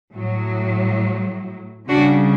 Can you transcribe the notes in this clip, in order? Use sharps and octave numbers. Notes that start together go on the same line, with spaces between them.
A2 F#3
C#3 G3 D4 F#4